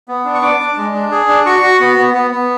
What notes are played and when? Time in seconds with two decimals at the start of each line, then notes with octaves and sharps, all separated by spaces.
0.08 B3
0.25 D4
0.34 C#6
0.42 D4 D6
0.60 D4
0.77 G#3
0.94 D4
1.11 G#4
1.28 D4
1.46 F#4 C#6
1.62 F#4
1.80 B3
1.97 B3
2.14 B3
2.31 B3